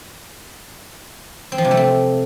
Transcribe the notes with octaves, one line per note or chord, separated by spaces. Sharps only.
C4
F3
C3
A3
C4